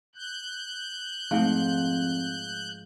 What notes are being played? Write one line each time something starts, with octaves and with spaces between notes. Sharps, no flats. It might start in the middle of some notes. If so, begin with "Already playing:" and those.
F#6 G6
F2 G#2 F3 A3 C4